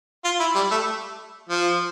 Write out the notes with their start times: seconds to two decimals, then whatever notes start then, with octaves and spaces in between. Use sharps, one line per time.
0.25 F4
0.40 E4
0.55 G3
0.71 A3
1.49 F3